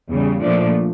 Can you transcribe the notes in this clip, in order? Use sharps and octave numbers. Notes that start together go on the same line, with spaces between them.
E2 C#3 G3
A#2 F3 A3 D4